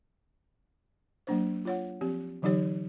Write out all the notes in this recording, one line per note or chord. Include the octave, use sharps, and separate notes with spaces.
F#3 A#3 D4 C5
F4 C#5 F#5
F3 C4 G4
D3 E3 F#3 D#4 G4 C#5